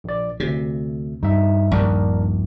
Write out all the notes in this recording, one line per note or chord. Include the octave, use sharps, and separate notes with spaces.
A#1 D5
D2 C3
G2 D#4 E5
A#1 D#2 D4 A#4